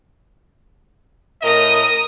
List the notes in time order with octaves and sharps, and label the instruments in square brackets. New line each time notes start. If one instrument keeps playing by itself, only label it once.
[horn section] A2 D#5 [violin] A#4 D#6